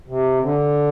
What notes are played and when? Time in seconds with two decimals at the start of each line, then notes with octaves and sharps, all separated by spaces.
0.08 C3
0.42 D3